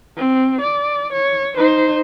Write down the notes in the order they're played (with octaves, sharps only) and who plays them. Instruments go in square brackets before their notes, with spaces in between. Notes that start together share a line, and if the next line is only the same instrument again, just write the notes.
[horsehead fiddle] C4
D5
C#5
D#4 C5